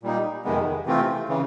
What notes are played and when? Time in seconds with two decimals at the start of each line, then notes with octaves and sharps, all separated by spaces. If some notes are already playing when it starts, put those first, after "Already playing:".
0.03 A#2 G3 A#3 D#4
0.45 F2 C3 D#3 G#3 B3
0.86 C3 E3 A3 C4 F4
1.29 C#3 E3